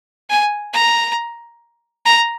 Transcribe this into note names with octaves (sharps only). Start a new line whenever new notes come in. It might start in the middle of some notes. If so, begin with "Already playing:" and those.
G#5
A#5
A#5